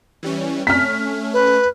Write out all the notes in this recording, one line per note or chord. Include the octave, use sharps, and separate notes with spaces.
E3 G3 C#4
A3 C#4 F6 B6
B4